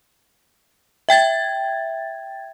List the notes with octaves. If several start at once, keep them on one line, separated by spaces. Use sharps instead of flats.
E5 G5 G#6 A6